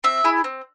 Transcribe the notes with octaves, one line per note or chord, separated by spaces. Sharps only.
C4 E5
E4 G#4
C4